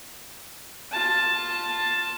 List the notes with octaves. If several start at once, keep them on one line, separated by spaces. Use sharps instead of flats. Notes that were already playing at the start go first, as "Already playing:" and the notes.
F4 A5